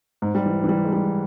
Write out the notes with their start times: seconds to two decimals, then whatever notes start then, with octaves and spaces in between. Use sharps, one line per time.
0.22 G#2
0.35 G3
0.46 E3
0.64 E3
0.69 G3
0.85 G#3
0.93 G3